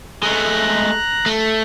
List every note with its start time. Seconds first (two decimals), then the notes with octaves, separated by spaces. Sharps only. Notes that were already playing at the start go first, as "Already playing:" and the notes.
0.23 G#3 A3 A#5 F#6
1.26 A3